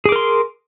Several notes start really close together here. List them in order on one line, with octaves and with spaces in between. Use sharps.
G#4 D6 A#4 C6